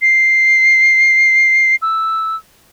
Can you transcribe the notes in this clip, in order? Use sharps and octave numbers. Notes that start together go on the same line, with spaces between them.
C7
E6